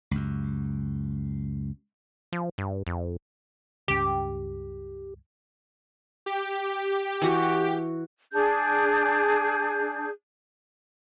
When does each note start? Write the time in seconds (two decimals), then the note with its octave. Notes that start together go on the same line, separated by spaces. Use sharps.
0.11 C#2 F#2
2.32 F3
2.58 G2
2.87 F2
3.88 C#2 G2 C#4 G4
6.26 G4
7.22 E3 F#4
8.32 D4 G#4 G6